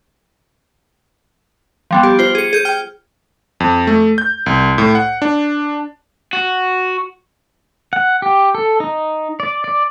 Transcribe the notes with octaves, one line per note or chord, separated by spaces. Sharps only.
F3 G3 B3
G4
F4 C5 G7
G#4 C#7
G#4 G6 D#7
G5 F6
F2
A3
G6
C2
A2
F#5
D4
F#4
F#5
G4
A4
D#4
D5
D5